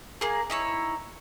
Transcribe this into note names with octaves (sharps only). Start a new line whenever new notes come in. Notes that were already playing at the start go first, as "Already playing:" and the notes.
A#3 G#4
D#4 E4 C#5